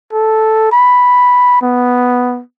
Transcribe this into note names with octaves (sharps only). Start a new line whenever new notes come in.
A4
B5
B3